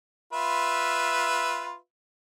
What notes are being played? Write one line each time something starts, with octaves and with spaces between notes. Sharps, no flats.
F4 B4 E5